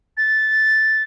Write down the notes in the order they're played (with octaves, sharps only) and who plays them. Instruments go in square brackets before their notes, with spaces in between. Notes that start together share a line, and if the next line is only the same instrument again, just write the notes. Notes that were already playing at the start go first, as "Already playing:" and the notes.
[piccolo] A6